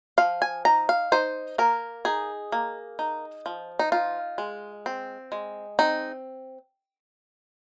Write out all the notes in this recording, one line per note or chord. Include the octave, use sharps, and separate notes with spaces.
F3 F5
G#5
D#4 A#5
F5
D#4 C5
A#3 A#4
D#4 G#4
A#3
D#4
F3
D#4
D#4 F4
G#3
C4
G#3
C4 D#4